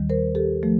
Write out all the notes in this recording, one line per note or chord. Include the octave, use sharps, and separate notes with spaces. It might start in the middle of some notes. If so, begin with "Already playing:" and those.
Already playing: D#2 D#3 G3
A#4 C5
G4 A4
F3 A3